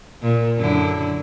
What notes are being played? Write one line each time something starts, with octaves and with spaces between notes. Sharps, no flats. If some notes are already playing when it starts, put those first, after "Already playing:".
A#2
F#2 D3 E4